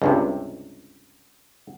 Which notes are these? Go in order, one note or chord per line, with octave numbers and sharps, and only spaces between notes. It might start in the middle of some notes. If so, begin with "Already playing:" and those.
C#2 G2 C3